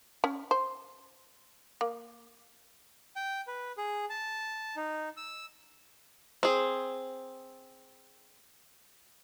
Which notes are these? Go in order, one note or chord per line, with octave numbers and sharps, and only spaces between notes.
C#4
C5
A#3
G5
B4
G#4
A5
D#4
E6
C4 G#4